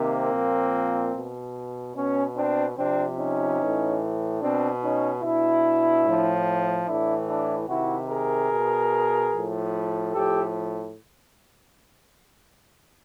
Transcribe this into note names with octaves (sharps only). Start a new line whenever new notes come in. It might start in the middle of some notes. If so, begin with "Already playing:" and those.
Already playing: C3 D#3 A#3 C4
A#2 F3
B2
B2 B3 C#4
C4 D4
C3 F3 C4 D4
C#4 D#4
A2 E3
B2 C4 D4
C#4 D#4
B2 D4 E4
A2 F3
A2 E3 D4 E4
D4 E4
C3 D#3 E4 F#4
G#4 A#4
B2
F3
A2
A2 F3 G4 A4